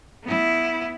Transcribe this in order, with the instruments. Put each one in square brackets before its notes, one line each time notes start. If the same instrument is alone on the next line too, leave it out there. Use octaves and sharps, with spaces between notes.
[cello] B3 E4